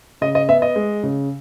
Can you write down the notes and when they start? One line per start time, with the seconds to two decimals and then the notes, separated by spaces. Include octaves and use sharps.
0.21 C#3 D#5
0.35 D#5
0.49 B3 E5
0.62 D#5
0.76 G#3
1.03 C#3